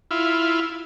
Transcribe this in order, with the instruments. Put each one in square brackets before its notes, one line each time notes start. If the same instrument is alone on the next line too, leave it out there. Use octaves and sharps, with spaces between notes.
[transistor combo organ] E4 F4